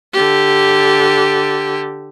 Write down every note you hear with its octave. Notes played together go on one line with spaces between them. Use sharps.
D3 G4